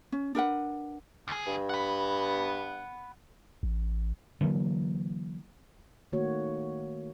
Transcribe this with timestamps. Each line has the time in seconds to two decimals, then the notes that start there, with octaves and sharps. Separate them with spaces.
0.12 C#4
0.35 D4 A#4 B4 F#5
1.28 D2 G#4
1.46 G2
1.69 F#5 B5
3.63 A1
4.41 D3 E3 F#3 A#3
6.12 D#3 A3 A#3 F#4 C#5